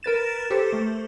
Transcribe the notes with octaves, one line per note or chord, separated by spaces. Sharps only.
A#4 B4 A6 E7
G4 A4 A#4 C5
A3